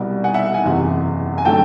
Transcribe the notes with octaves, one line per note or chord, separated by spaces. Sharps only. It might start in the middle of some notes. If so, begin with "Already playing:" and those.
Already playing: C2 B2 G3
F#5 G#5
E5 F#5
F#5 G#5
F#1 E2 C3 E3
G#5
D3 F#3 A3 G5 A5